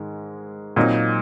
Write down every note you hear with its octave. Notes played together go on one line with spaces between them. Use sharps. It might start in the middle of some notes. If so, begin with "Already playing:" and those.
Already playing: G#2 D#3 G#3
A#2 F#3 C4 D#4